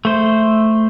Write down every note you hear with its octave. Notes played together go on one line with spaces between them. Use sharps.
A3 C5